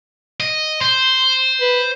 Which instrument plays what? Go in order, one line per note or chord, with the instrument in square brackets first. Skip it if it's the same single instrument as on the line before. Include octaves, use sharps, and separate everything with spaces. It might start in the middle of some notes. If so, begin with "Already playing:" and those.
[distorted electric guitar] D#5
[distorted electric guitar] C5 [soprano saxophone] C6
[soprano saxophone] B4